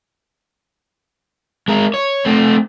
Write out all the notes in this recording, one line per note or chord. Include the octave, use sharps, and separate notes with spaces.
G#3 A#4
C#5
A3 C4